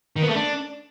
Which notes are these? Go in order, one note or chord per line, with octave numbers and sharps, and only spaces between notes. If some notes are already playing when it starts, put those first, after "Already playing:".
D#3
B3
A3
D4